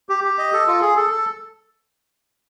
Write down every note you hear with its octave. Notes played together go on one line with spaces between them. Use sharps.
G4
G4
D#5
A4
F4
G#4
A4
A4